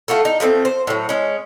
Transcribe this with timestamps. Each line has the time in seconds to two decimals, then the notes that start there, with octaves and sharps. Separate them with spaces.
0.08 A3 F4 F#4 A4
0.25 D#4
0.40 F3 A3 B3 C4
0.65 C5
0.87 A2 F#3
1.09 G#3 C#4